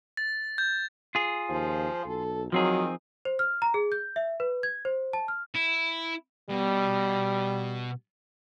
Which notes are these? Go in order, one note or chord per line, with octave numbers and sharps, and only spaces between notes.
A6
G6
F4 G#4
D#2 F3
B1 A4
D#3 F3 F#3 C4 G#4
C5
F6
A#5
G#4
G6
E5
B4
G#6
C5
A5
F6
E4
B2 G3